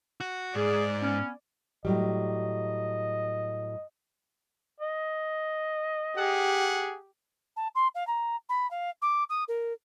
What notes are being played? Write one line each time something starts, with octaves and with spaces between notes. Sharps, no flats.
F#4
G#2 G#4 D5
B3 C#4
A2 F#3 G3 D#5
D#5
G4 G#4 F#5
A5
C6
F5
A#5
B5
F5
D6
D#6
A#4